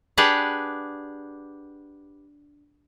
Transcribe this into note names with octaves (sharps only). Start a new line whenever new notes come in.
D4 G4 G#4 B4 F#5